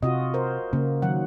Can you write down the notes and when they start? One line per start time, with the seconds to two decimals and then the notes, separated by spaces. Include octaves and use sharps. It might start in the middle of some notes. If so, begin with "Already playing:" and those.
0.03 C3 F4 F#4 D#5
0.34 A#4 C5
0.73 C#3 A#3
1.02 D#3 F#3 F#5